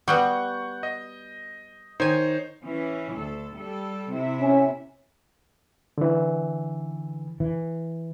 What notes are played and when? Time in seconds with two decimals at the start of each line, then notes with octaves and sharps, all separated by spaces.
0.08 G3 B3 F#4 F#5 C#6 G6
0.83 D#5
2.00 D#3 D#4 C5 C#5 G#5
2.64 E3 C#4
3.14 D2 A4
3.56 G3 A4
4.13 C3 E4 E5
4.41 C#4
5.98 D3 E3
7.40 E3